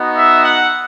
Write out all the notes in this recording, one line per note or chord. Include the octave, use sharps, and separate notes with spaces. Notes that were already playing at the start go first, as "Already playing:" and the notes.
Already playing: B3 D#4 F#4
E5
F#5